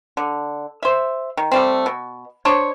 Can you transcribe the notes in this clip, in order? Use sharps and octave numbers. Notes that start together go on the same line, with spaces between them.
D3
C5 E5
D#3
G3 A3 C4
B2
D4 C5 C#5